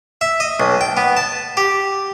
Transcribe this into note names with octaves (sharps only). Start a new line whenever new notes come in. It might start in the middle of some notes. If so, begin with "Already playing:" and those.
E5
D#5
B1
G5
B3
A5
G4